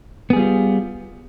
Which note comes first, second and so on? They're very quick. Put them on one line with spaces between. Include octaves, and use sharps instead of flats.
B3 G#4 G3 F4